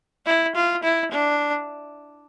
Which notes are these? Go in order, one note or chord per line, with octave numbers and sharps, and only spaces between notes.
E4
F4
E4
D4